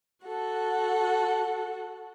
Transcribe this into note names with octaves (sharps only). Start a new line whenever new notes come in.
F#4 A4 F#5